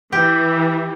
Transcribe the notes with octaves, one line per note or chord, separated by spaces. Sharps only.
E3 G4